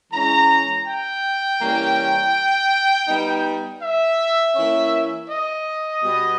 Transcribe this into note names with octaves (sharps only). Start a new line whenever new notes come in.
E3 G#3 C#4 A#5
G5
E3 G3 A#3 C#4
G3 B3 D#4
E5
E3 A#3 C#4
D#5
B2 G3 B3